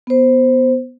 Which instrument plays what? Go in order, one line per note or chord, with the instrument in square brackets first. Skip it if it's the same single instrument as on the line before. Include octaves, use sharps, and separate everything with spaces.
[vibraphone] B3 C5